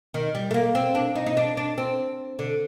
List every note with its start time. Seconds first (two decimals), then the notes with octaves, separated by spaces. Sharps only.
0.14 D#3
0.35 G3
0.51 A3
0.54 A#3
0.75 C4
0.95 D4
1.15 D#4
1.26 D#4
1.37 D4
1.57 D4
1.78 C4
2.39 D3